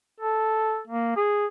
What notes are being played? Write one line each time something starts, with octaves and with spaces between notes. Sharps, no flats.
A4
A#3
G#4